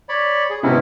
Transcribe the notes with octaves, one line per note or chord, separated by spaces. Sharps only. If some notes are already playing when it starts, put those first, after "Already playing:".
C#5 D5 B5
G#4
G#1 C3 B3 C#4 E4